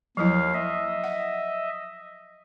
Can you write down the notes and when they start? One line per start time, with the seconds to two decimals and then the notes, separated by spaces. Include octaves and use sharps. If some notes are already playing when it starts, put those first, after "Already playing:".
0.17 D#2 F3 F#3 E4 F5
0.54 D#5 E5
1.04 F#5